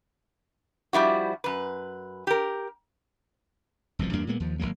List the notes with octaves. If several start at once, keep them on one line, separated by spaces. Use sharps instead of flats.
F3 G3 E4 F#4
F#2 B4
G4 A#4
F1 C2 B2 F3
E2 G2 A#3 D4
A#2 G#3 A#3 B3
D#2 F3
G#1 E2 F#3 A#3